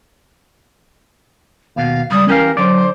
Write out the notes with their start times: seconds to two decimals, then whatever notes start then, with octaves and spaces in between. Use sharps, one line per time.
1.76 D#2 B2 F5
2.11 C#2 G3 D#6
2.28 E3 C#4 G4 A#4 F5
2.57 D3 F#3 C5 D5